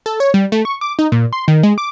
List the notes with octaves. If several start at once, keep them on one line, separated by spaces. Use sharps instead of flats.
A4
C#5
G3
A3
C#6
D6
D#4
A#2
C6
D#3
G#3
D6